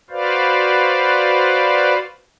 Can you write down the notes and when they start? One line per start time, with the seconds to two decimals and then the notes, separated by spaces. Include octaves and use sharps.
0.10 F#4 B4 C5 D5 F5